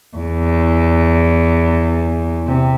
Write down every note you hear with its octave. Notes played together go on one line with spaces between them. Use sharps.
E2
C3